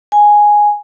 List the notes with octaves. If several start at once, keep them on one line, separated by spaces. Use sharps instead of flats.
G#5